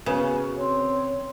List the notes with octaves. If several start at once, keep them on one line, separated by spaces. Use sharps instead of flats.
C#3 A#3 B3 F#4
C4 C#5